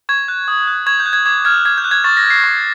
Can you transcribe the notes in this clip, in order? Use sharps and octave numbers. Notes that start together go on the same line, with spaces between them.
C#6 G#6
F#6
D#6
F#6
C#6 G#6
G6
F#6
G#6
D6 G#6
F6 G#6
D6 G#6
G6
F#6
G#6
C#6 A6
A#6
F6
C7
C#6